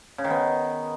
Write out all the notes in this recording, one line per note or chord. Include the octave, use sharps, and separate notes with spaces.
C#3
D#3
B3